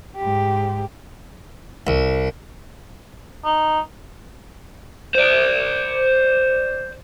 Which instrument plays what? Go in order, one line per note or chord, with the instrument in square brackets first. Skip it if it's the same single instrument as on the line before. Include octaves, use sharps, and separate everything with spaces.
[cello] G#2 G4
[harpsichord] C2
[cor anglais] D#4
[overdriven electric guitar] C5 D5